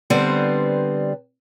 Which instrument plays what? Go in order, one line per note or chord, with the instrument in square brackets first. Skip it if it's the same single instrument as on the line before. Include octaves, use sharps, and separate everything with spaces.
[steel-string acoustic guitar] D3 G3 B3 C4 B4 C5